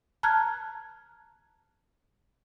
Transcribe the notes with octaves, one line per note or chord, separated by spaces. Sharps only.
A5 A#5 F6 F#6 G#6